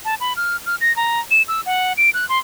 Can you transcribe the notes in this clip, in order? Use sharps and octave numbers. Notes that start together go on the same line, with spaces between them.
A5
B5
F6
F6
A#6
A#5
E7
E6
F#5
D7
F#6
C6